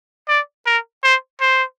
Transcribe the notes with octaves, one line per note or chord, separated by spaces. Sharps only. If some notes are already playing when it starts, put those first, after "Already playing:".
D5
A#4
C5
C5